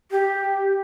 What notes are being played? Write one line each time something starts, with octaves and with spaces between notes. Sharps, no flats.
G4